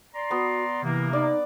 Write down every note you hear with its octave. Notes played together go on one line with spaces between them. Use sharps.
D5 A#5 C6
B3 F#4
C3 E3 A#3
D#4 D5